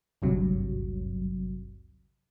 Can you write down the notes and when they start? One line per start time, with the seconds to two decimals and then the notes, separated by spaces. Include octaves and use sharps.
0.22 G#1 D2 G2 C3 F#3